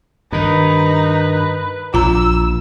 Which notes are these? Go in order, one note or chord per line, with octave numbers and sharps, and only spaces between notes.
G2 D#3 D#4 B4
A#1 F4 A#5 E6